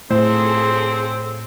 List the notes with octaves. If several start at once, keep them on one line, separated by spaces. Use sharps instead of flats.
A2 C4 F4 G#4 A4 C5